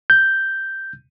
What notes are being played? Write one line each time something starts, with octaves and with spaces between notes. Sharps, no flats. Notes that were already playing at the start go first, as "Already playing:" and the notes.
G6